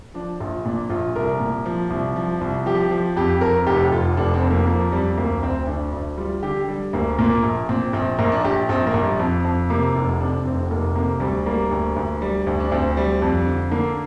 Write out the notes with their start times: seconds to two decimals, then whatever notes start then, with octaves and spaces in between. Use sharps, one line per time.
0.14 F3 D4
0.40 A#1 F4
0.65 A#2 D4
0.90 A#1 F4
1.16 C2 A#4
1.40 A#2
1.65 F3
1.90 C2
2.16 F3
2.41 C2
2.66 F3 G4
2.91 F3
3.16 F2 G4
3.41 F2 A#4
3.67 F1 G4
3.91 F1 F4
4.17 F1 D4
4.34 C4
4.41 F2
4.50 A#3
4.67 F3 A#3
4.92 F2 G3
5.17 D2 A#3
5.43 D2 C4
5.67 D2 D4
5.93 D2 D4
6.18 G3 F4
6.43 D3 G4
6.68 G3
6.93 D2 A#3
7.19 A#2 A#3
7.43 A#1
7.69 A#2 C4
7.93 A#1 C4
8.19 A#1 A#3
8.32 D4
8.44 A#1 G4
8.69 A#1 C4
8.87 A#3
8.94 A#1
9.02 G3
9.19 F2
9.45 F2
9.70 C3 A#3
9.95 F1
10.20 C3 D4
10.45 F1 C4
10.70 F1 A#3
10.95 C3 A#3
11.20 D2 G3
11.46 G3 A#3
11.71 D2
11.96 D2
12.22 G3
12.47 D2
12.60 D4
12.72 D2 C4
12.97 G3
13.22 F2
13.47 D3
13.72 D3 A#3